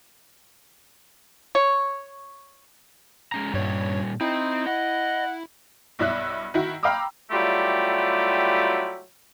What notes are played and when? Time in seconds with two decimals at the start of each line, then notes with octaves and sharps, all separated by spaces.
1.55 C#5
3.32 G#3 C#4 A#5
3.54 G2 A#2 G3 C#5
4.21 C4 D#4 E4
4.66 D#5 F#5
5.99 B1 G2 E4 D5 E5 F#6
6.54 D#3 E4 F#4
6.83 F5 G5 A#5 B5 D6 E6
7.31 F#3 G3 A3 E4 F4 G4